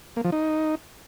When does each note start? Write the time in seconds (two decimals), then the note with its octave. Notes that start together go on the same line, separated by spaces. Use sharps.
0.16 A#3
0.24 F3
0.32 D#4